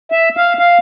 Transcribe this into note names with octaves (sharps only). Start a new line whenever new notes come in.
E5
F5
F5